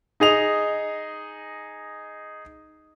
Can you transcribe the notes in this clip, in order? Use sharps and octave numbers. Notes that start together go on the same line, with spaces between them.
D#4 G#4 D#5 F7